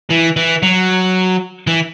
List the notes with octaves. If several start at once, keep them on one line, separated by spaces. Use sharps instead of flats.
E3
E3
F#3
E3